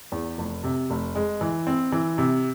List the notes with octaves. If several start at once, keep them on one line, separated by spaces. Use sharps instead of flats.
E2
F1
C3
F1
G#3
E3
C4
E3
C3